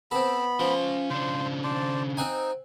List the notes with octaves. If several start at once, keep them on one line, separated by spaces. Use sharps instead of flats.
B3 C4 A4 B5
F3 C#4 C6
C#3 D4 C5
C5 D5 A5
C4 D#4 F#5 G#5